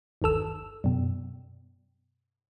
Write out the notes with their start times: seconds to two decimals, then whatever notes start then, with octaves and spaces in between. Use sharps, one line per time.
0.22 G1 D#2 A4 E6
0.84 F#2 B2